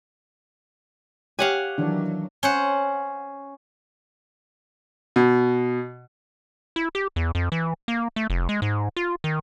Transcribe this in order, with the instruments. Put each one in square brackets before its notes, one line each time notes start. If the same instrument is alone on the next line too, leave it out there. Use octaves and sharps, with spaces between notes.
[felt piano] G4 C#5 [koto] F5 F#5 G#5
[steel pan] D#3 E3 D4 [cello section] F#3
[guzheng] C#4 C5 F#5
[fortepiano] B2
[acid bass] E4
G4
E2
F2
E3
A#3
A3
F1
G#3
G#2
F4
D#3